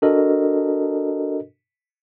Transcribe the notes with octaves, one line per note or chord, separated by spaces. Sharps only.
D4 F#4 A4 A#4 D#5